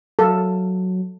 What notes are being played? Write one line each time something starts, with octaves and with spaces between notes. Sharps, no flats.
F#3 A4 F5